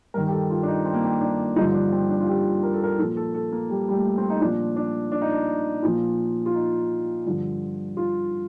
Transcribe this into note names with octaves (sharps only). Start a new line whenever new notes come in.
G2 D#3 A#4
G4
A4
F4
D4
D#4
C4
A#3
C4
D4
G2 D3 F3 D#4
D4
C4
D4
F4
G4
A#4
A4
A#4
A#2 F3 A4
A4
A4
A#3
G3
G3
A3
C4
D#4
A#2 F3 D4
D4
D4
D#4
D4
A#2 F3
F4
D#4
G2 D3 F3
F4